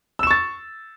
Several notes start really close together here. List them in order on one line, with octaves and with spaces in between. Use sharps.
E6 E7 C#6 A6